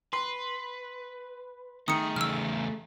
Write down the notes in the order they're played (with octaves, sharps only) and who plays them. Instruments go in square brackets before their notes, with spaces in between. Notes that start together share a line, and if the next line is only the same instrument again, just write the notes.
[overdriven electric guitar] B4 [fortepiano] C6
[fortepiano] D#3 [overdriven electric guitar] A3 G#4 [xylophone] D#6 C#7
[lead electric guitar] E2 C#3 [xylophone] E6 F6